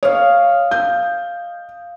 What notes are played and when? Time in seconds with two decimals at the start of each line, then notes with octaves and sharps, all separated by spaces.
0.03 C#5 D#5 F5
0.71 G6